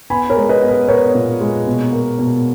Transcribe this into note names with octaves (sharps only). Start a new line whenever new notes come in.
B3 G#5 B5
A#4 C#5
G#3
B4 D#5
B3
B4
B3 A#4 C#5
A#2
G#3
B2
A#3
B2